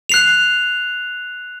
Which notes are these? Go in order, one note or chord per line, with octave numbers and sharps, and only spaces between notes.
F#6 C7 F7